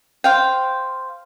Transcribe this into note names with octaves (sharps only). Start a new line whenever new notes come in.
C5 F5 G5